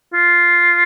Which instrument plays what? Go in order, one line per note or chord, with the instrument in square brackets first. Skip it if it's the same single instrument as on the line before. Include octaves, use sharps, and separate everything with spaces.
[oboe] F4